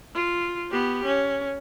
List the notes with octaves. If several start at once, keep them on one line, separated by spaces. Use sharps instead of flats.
F4
B3 G4
C#4